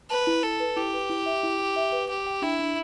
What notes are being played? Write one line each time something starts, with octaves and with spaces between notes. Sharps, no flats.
B4 A5
E4
E4 A4
B4
E4 G4
B4
E4
E5
E4
E4
E5
B4
G4 G5
G5
D4 E4
D4